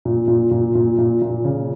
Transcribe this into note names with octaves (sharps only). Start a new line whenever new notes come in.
A#2
A#2
A#2
A#2
A#2
A#2
C#3